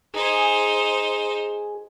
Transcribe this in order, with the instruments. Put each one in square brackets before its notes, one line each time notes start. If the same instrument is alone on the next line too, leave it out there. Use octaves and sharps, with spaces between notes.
[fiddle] D#4 C5 [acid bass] G#4